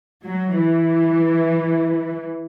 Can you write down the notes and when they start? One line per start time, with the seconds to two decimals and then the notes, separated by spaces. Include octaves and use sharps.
0.24 F#3
0.60 E3